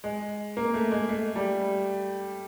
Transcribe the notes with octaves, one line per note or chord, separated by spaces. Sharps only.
G#3
A#3
A3
G#3
A3
G3